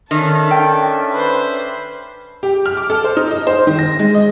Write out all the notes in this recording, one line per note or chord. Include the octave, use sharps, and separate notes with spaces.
D#3 C#4 D4 A4 E5
G5
B4 C5
G4
F6
D6
A4
C5
D#4
D#5
C5
D#3
A#6
G#3
D#5